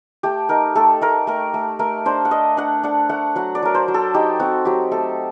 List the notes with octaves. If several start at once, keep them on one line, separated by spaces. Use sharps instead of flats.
A3 G4
D#4 A#4
A3 A4
A3 A#4
A3 A#4
A3
A3 A#4
D4 C5
F#5
D4 D#5
D4 F#5
D4 F#5
A3 F#5
F#3 F#5
D5
F#3 A#4
C5
F#3
A4
D#4 G4
C4 F#4
F#3 G4
A3 A4